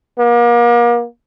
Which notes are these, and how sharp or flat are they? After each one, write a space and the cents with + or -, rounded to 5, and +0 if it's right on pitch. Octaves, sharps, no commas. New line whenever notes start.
A#3 +35